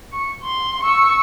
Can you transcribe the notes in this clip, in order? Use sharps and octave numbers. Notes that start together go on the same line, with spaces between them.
C#6
C6
C#6 E6